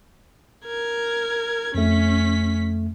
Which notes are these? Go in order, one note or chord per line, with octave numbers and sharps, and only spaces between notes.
A#4 G#6
F2 A3 C#4 B6